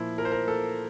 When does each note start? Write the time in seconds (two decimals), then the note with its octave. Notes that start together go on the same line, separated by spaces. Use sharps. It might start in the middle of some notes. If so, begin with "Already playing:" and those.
Already playing: A#2 F3 A#3 E4
0.18 F3 A#4
0.25 C5
0.32 A#4
0.47 A#3 A4